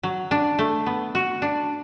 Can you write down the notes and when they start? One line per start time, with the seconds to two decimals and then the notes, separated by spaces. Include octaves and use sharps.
0.03 F#3
0.31 D4
0.59 A3
0.86 B3
1.15 F#4
1.42 D4